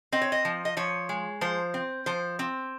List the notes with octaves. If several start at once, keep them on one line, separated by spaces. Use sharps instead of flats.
C4 D#5
C#5
D#5
F3
D#5
F3 C#5
G#3
F3 C5
C4
F3 C5
C4